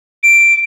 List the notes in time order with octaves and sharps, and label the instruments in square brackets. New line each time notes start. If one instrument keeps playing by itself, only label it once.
[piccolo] D7